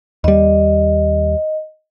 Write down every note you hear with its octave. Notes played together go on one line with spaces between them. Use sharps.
D#2 G3 D#5